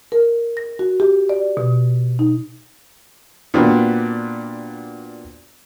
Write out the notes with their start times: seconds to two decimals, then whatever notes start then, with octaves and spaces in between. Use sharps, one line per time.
0.12 A#4
0.57 A#6
0.79 F#4
1.00 G4
1.29 D5
1.57 B2
2.19 D#4
3.54 A#2 B3 C4 D4 F#4